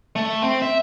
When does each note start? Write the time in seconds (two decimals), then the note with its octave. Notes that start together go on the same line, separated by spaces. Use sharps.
0.16 A3
0.42 C4
0.62 E5